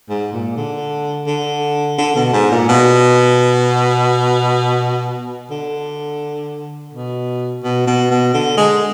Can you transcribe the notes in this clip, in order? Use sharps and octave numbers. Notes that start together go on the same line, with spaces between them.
G#2
A#2
D3
D3
D3
B2
G#2
A#2
B2
D3
B2
B2
B2
B2
D3
G#3